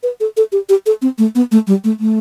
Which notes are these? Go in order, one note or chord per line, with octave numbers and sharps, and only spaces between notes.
B4
A4
A4
G4
G4
A4
C4
A3
B3
A3
G3
A3
A3